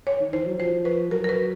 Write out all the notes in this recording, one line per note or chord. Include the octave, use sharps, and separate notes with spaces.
C#5
D#3
E3 C5
F#3
F3 C5
B4
F#3 A#4
A#4
B4